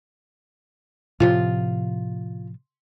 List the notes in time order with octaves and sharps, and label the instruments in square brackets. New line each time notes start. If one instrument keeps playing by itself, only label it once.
[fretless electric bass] A2 C3 F3 [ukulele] F4